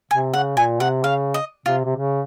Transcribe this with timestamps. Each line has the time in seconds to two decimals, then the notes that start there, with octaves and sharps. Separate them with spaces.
0.11 C3 G#5
0.34 C#3 F#5
0.57 A#2 G#5
0.80 C3 F#5
1.04 C#3 F5
1.34 D#5
1.66 C3 F4
1.85 C3
1.97 C#3